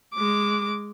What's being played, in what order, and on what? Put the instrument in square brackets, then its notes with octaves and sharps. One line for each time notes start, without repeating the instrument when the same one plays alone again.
[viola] G#3 D6